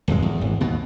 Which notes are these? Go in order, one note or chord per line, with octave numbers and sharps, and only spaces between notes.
D1 G#1 F2 G#3
E2
G#1
D#2 B2